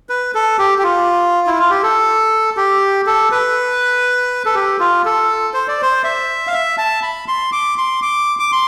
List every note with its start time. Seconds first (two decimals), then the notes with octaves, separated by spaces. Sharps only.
0.09 B4
0.35 A4
0.58 G4
0.78 G4
0.83 F4
1.47 E4
1.59 F4
1.70 G4
1.83 A4
2.57 G4
3.06 A4
3.31 B4
4.46 A4
4.55 G4
4.80 F4
5.05 A4
5.54 C5
5.68 D5
5.82 C5
6.04 E5
6.47 F5
6.54 E5
6.78 A5
7.02 B5
7.28 C6
7.52 D6
7.78 C6
8.02 D6
8.39 D6
8.52 C6